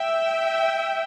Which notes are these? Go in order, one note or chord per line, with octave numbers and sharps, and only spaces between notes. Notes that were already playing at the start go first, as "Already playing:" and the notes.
Already playing: E5 G5